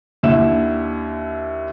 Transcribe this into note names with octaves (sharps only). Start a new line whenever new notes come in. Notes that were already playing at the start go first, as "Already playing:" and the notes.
D#2 D3 E4 E7